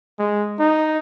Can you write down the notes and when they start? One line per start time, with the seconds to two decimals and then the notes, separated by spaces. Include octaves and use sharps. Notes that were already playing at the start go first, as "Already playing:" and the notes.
0.19 G#3
0.59 D#4